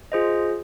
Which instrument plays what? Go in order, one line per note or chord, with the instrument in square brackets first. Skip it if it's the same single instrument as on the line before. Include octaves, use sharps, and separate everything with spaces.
[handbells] F4 G#4 C5 D#5